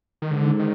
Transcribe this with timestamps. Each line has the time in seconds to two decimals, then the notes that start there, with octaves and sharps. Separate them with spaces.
0.22 D#3
0.31 G#2 D3
0.59 D#3